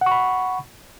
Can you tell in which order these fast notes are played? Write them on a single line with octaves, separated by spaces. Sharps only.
F#5 C#6 B5